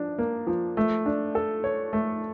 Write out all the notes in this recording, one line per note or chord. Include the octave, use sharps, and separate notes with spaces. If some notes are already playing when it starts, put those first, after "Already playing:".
Already playing: F3 D4
A#3
F3
A3
D4
A4
C#5
A3